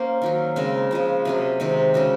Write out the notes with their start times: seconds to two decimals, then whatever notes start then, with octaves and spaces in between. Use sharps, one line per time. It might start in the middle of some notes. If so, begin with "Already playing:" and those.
Already playing: A#3 C#4 C5
0.22 D#3 F#3 C#4
0.56 C#3 G#3 C4 A#4
0.91 C#3 F3 G#3
1.25 C3 F#3 C#4 G#4
1.60 C3 D#3 G#3 C4
1.94 C#3 G#3 C#4 F#4